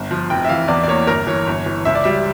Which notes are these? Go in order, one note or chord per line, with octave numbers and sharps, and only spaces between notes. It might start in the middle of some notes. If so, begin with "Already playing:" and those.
Already playing: G1
F3
F1 G5
E5
E3 F5
E2 D5
D5
A#3 C#5
G1 A#4
E3 C#5
G1
E3
C#2 E5
D5
G3 E5